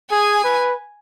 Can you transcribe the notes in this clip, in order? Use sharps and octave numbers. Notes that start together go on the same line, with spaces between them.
G#4 G#5
B4